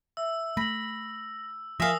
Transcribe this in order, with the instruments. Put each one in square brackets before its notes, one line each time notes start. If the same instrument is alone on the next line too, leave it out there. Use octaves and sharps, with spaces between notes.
[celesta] E5 [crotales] E6
[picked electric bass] A3 [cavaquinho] B5 [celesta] A#6 F#7
[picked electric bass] F3 [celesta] A#4 G#5 A#6 [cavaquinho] E5 F5 [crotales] D#6 E6